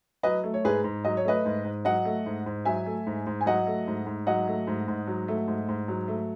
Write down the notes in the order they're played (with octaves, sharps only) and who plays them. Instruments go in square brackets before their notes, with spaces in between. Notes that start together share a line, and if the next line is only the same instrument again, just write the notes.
[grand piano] F#3 B4 D#5
A3
C#5
G#2 G#4 B4
G#2
F#3 D#5
C#5
A3 B4 D#5
G#2
G#2
F#3 D#5 F#5
A3
G#2
G#2
F#3 E5 G#5
A3
G#2
G#2
G#5
F#3 D#5 F#5
A3
G#2
G#2
F#3 D#5 F#5
A3
G#2
G#2
F#3
A3
G#2
G#2
F#3
A3